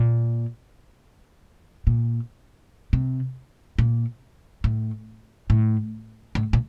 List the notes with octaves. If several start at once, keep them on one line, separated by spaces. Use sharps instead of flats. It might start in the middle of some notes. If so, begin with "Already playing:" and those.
Already playing: A#2
A#2
C3
A#2
A2
A2
A2
A#2